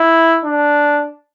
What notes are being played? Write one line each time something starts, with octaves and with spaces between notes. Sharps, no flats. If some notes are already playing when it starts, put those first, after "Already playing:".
Already playing: E4
D4